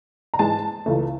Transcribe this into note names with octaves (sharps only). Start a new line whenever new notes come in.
A#5
G#2 E3 G#3 A5
C#2 C#3 E3 A3